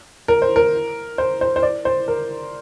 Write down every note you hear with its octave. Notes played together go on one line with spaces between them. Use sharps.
A#4
C5
A#4
C5
C5
C5
D5
C5
A#4